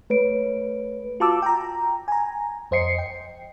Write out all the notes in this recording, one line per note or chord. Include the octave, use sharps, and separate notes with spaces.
A3 B4 C#5 D7
F4 F#4 A5 D6 E6
G5 A#5
G#5 A#5
F2 C5 D#5 C7 C#7
G5